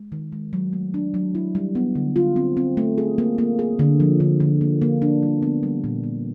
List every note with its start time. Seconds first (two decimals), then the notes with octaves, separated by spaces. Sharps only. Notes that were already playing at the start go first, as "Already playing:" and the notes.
Already playing: G#3
0.12 D#3
0.32 G#3
0.53 F#3
0.73 A3
0.94 D4
1.14 F#3
1.35 E4
1.55 G3
1.75 B3
1.95 D3
2.16 F4
2.36 C4
2.57 C4
2.77 A3
2.98 G#4
3.18 A#3
3.38 A#3
3.59 G#4
3.79 D3
4.00 F3
4.20 D3
4.40 D3
4.61 A#3
4.82 A#3
5.02 D4
5.23 G3
5.42 B3
5.63 G3
5.84 A#2
6.04 B3